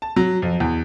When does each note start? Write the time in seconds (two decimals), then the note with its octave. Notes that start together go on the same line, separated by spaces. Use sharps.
0.02 A5
0.16 F#3
0.42 F2
0.60 E2